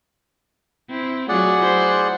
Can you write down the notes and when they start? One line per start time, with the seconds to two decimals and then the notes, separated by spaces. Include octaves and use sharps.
0.90 C4 E4
1.29 F#3 A3 F4 G#4 D5 F#5
1.58 E4 C5